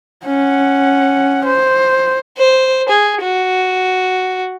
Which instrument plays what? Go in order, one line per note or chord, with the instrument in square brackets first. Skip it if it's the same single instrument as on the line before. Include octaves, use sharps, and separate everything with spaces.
[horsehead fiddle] C#4 F#5
C5
[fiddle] C5
G#4
F#4